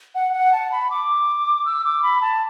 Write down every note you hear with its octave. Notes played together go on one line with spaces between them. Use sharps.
F#5
F#5
A5
B5
D6
E6
D6
B5
A5